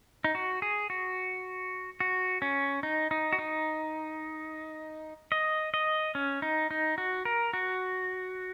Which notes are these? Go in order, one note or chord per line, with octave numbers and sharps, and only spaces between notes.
D#4
F#4
G#4
F#4
F#4
C#4
D#4
D#4
F#4
D#4
D#5
D#5
C#4
D#4
D#4
F#4
A#4
F#4